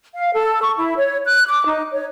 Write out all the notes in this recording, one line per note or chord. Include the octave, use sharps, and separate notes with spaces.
F5
A4
C#6
E4
C#5
F#6
D6
D#4
C#5